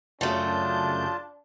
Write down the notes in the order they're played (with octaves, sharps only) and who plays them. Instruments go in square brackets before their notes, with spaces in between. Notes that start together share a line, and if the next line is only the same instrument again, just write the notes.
[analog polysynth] F#2 C#3 G6 [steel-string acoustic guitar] F#3 A3 [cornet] D4 [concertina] F4 A5